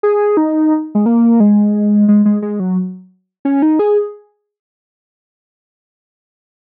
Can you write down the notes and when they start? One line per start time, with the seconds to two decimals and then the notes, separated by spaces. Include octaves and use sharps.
0.03 G#4
0.37 D#4
0.95 G#3
1.06 A#3
1.40 G#3
2.08 G#3
2.25 G#3
2.42 G#3
2.60 F#3
3.45 C#4
3.62 D#4
3.79 G#4